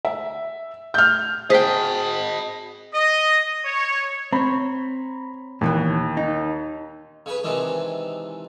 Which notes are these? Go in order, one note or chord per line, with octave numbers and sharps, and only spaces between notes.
E5
F6 G6
G#4 C5 D#5 G5 A5 B6
D#5
C#5
C4 C#5 A#5 B5
D#2 A#2 E3 B3
D#4
C#3 G#4 B4
C3 D#3 E3 G#3 D4